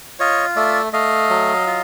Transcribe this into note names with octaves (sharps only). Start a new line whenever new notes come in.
F4 C#5 D#5
A3 D5 E5
A3 D#5 F5
F#3
F4